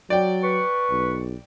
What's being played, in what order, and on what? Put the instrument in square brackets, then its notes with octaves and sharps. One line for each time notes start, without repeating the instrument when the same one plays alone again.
[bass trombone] F#3 [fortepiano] D5 G5
[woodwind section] B4 C#6
[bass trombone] B1